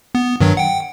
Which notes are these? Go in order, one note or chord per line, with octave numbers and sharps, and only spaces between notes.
B3
G2 D#3 F#3
F#5 G5